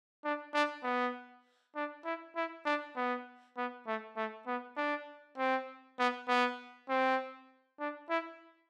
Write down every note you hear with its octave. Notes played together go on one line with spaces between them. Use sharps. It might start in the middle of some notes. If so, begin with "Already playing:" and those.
D4
D4
B3
D4
E4
E4
D4
B3
B3
A3
A3
B3
D4
C4
B3
B3
C4
D4
E4